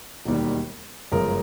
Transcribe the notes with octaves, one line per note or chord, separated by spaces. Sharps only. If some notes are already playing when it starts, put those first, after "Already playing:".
E1 D#2 D#3 G3
G1 F#2 C#3 F3 G#3 A#4